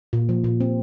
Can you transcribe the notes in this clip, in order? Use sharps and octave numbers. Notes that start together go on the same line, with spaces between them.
A#2
F3
A#2
C4